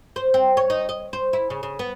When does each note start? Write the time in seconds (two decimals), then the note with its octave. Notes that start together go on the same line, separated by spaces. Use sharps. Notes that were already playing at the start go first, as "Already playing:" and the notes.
0.16 C5
0.34 C4
0.57 C#5
0.70 D#4
0.89 D#5
1.13 C5
1.33 E4
1.50 C#3
1.63 C#3
1.79 B3